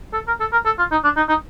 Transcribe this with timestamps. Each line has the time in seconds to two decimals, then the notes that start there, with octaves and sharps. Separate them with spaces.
0.13 A4
0.27 A#4
0.40 A4
0.52 A#4
0.65 A4
0.78 F4
0.91 D#4
1.04 D4
1.17 D#4
1.29 D#4